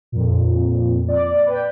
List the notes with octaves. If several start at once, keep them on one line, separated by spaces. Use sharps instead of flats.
F2 A#2
D5
B4 G5